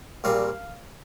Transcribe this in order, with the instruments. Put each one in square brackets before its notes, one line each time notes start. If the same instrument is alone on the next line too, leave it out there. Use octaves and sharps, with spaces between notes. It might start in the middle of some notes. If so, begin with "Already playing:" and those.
[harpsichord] A#1 A#2 G3 C4 F5